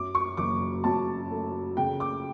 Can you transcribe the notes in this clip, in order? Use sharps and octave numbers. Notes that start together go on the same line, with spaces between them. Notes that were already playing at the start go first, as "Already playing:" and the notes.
Already playing: F#2 D6
C#6
F#1 D6
F#2 A5
A3
C#3 G5
D6